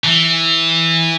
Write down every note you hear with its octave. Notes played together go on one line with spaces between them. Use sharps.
E3